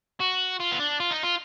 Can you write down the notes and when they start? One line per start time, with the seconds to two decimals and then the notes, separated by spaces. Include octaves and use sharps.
0.20 F#4
0.60 F4
0.72 B3
0.79 D4
1.00 F4
1.11 D#4
1.23 F4